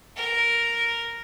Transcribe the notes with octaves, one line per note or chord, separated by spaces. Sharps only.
A#4